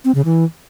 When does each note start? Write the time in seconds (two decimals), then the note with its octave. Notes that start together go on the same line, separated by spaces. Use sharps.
0.05 C4
0.15 C#3
0.25 E3